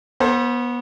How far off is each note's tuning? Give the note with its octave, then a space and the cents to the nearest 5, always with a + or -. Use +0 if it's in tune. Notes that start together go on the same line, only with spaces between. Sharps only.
B3 -25 A4 +20 C5 +20